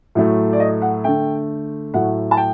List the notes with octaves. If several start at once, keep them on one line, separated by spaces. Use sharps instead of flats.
A2 F#3 A3
D5
D#5
F#5
D3 A3 G5
A2 F#3 A3 F#5
A5
G5